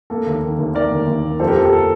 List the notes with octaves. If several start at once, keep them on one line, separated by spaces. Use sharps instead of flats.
A#3 A4
D#2
D#3
D#2
D#3 A#4 D5
D#2
D#2
A#3
F2 A4 C5
G4 A#4
F2 A4
G4
A4